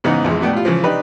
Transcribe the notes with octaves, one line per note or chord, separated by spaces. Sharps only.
G#2 C#3 E3 B3 D#4
A#1 F2 E3 G#3
B2 A3 B3 D4 G5
A2 G3 F4
C#3 E3 F3
C3 D4 D#4 G4 B4